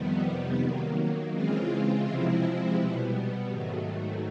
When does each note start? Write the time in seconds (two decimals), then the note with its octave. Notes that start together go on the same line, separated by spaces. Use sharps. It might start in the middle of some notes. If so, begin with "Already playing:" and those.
Already playing: F2 C3 D#3 G3 B3
0.59 D#3 F#3 A#3
1.31 C#3 E3 G#3 C4 F4
2.04 C3 F3 G#3 C4 E4
2.76 B2 G3 B3
3.49 G#2 D#3 F#3 A3